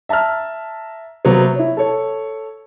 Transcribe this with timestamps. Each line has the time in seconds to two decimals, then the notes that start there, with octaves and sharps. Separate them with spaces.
0.09 E5 A5 A#5 E6 F6
1.25 C3 F#3 A#3 B3
1.55 E4 C#5
1.77 A4 C#5